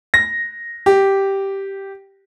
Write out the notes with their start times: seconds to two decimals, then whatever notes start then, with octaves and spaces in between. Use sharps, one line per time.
0.14 A#6
0.86 G4